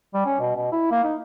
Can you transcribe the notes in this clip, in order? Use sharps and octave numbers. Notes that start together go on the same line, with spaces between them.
G3
C#4
B2
B2
E4
A#3
D#4